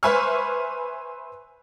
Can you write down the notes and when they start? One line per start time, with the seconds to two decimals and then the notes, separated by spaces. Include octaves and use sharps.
0.03 B4 C5 E5 G#5 C#6 F6